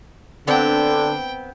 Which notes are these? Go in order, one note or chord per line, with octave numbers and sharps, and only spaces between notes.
D3 B3 C4 D4 G5